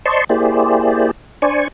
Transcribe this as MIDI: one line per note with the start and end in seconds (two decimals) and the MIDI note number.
0.06 0.24 72
0.06 0.24 74
0.06 0.24 75
0.06 0.24 81
0.06 0.24 84
0.06 0.24 85
0.29 1.11 58
0.29 1.11 64
0.29 1.11 67
0.29 1.11 68
0.29 1.11 72
0.29 1.11 74
1.42 1.68 62
1.42 1.68 72
1.42 1.68 74
1.42 1.68 80
1.42 1.68 85